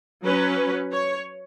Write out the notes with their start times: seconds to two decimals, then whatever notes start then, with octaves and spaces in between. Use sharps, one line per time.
0.24 F#3 C#4 B4
0.91 C#5